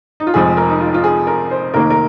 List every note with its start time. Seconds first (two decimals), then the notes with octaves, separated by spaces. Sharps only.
0.20 D#4
0.27 F4
0.34 F1 F2 F3 G#3 G#4
0.57 A#4
0.69 D#4
0.80 F4
0.94 F4
1.04 G#4
1.27 A#4
1.51 C5
1.74 F1 D#2 D#3 A#3 A#4
1.90 A#4